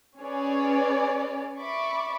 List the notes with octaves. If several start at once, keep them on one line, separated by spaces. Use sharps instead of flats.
C#4 G#4 B4 C#5 D5
D5 E5 B5 C#6 D6